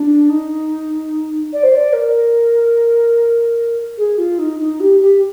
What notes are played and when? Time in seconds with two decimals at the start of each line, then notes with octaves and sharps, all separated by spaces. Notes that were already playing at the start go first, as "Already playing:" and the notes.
Already playing: D4
0.30 D#4
1.53 D5
1.63 C5
1.75 D5
1.93 A#4
3.98 G#4
4.18 F4
4.39 D#4
4.59 D#4
4.80 G4
5.00 G4